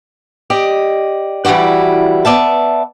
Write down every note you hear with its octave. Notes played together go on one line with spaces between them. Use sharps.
G4 D5 D#5
E3 G3 E4 F#4 D5
B3 D5 E5 A5